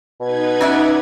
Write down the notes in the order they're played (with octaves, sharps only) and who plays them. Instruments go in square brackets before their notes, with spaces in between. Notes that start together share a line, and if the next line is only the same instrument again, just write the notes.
[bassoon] B2 [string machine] D#4 B4 G#6
[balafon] C#4 [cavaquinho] D5 E5 F#5